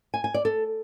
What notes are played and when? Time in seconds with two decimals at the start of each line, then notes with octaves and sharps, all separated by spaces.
0.14 G#5
0.24 G#5
0.34 D5
0.45 A4